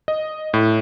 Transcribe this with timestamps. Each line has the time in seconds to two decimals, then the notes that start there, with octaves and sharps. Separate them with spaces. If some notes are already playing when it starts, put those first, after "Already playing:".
0.08 D#5
0.54 A2